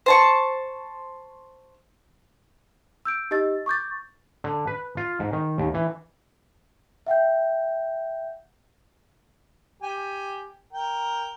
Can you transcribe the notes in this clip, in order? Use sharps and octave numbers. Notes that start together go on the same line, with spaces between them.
C5 A5 C#6
E6 G6 D7
D#4 G4 D#5 E6 A6
C#6 D6 G6 A6
D3
B4
F4
G#2
D#3
D#2
E3
E5 F#5 G5 G6
G4 G#5
A#4 G5